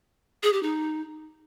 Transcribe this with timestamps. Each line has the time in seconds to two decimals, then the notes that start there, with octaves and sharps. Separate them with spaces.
0.43 G#4
0.53 G4
0.63 D#4